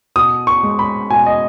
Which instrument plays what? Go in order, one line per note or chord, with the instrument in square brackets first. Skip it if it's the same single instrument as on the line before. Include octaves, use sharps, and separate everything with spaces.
[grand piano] B2 D#6
C#6
G#3
B5
B2 G#5
D#5